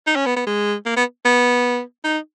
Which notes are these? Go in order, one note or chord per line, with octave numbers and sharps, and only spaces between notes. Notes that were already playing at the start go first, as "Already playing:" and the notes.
D#4
C#4
B3
B3
G#3
A#3
B3
B3
D#4